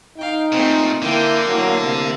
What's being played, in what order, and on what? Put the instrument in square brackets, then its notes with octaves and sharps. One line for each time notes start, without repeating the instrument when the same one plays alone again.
[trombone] D#4 [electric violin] F5 G5
[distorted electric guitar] A#2 [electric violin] A3 C4
[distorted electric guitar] D3 [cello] A#3 [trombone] E4 [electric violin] G5
[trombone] F#3 [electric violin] E4
[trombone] C3